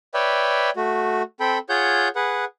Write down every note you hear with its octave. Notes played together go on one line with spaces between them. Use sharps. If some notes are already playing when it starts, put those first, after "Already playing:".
B4 C#5 D5 E5 G5
A3 F#4
C4 A4 G5 B5
F4 G#4 C#5 F#5 G6
G#4 B4 F#5